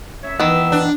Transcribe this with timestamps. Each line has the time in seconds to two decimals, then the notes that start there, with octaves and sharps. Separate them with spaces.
0.24 F#2 C#5 E5
0.40 D#3 E3 B3 E5 E6
0.72 D4